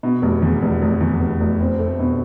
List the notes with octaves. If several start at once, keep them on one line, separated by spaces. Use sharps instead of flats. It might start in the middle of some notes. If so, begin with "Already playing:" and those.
B2
F1
E2
F1
F1
E2
F1
F1
C4
A3
B2